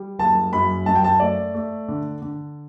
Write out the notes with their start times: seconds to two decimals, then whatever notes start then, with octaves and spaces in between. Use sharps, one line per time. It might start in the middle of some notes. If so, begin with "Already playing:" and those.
Already playing: G3
0.19 F#1 A5
0.53 F#2 B5
0.86 F#2 A5
0.95 G5
1.04 A5
1.20 A3 D5
1.55 A3
1.88 D3
2.22 D3